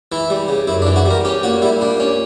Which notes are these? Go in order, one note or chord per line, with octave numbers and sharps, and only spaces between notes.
E3 E4
G3
C#3
F#2 E4
D4
E3
F#4
G3
A#4
C#4 G4
A#2 F#4
G3 E4
A#2 D4
C#4